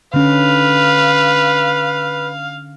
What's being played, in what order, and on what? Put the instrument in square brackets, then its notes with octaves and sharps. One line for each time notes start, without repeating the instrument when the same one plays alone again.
[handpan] D3 C#4 [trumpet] B4 [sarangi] F5